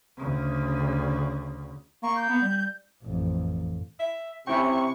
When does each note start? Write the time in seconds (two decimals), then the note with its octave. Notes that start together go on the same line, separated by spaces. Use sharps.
0.18 D2 C#3
2.03 A#3 C#6
2.17 G6
2.30 B3
2.42 G3
3.04 A1 F2
3.99 E5
4.47 C3 C4 C#4 E4 G5 C#6